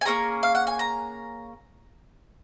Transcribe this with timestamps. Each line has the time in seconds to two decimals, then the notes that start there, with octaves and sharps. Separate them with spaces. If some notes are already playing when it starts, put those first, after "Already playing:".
0.01 G#5
0.05 A#3 C#4 G#4 A#5
0.43 F5
0.55 F#5
0.67 G#5
0.79 A#5